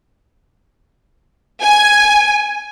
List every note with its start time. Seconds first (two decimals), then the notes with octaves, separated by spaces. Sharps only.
1.62 G#5